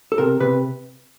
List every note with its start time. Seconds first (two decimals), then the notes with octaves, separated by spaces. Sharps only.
0.12 A4
0.18 C3 A#4
0.40 C3 B4